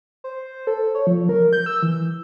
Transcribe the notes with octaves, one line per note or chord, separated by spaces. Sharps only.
C5
A4
C#5
F3
A#4
G6
E6
E3